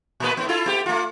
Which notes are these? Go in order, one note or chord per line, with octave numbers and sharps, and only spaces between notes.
A#2 A#3 B4
A2 B3
E4 F4 A4
B3 G4
A3 F4